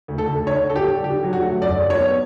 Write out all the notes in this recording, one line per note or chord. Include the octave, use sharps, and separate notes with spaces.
D2
A4
D2
D3 C#5
D3 A4
G4
G3
D3 G4
F#3
F#4
A3
F#2 D5
G3
C#5
B3